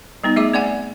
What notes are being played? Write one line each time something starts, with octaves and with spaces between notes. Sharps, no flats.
G3 B3 D#4
A3 G#4 E5 D6
C4 D5 F#5 G#5